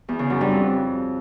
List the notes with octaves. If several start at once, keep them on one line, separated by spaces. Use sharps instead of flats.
E2
C#3
F#2
G2
F2